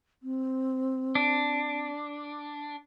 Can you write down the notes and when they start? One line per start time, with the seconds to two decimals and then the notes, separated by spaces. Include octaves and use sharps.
0.23 C4
1.15 D4